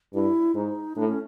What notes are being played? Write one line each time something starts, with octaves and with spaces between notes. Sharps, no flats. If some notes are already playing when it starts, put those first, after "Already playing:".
G2 E4
G#2 D#4
A2 D4
C#4